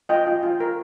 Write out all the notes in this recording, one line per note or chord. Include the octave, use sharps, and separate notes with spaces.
F4 D#5 G5
F4
F4
A#4